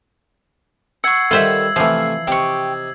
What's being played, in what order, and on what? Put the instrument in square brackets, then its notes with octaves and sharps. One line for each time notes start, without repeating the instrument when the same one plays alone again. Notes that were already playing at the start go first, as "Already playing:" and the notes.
[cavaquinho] F#5 C#6 [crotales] E6 G#6 C7
[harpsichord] D#3 G3 A4 [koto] F4 C5 E5 [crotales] G#6 F#7
[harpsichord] C3 A3 [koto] E3 F3 [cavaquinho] F5
[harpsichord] C3 D#4 [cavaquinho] G4 C#6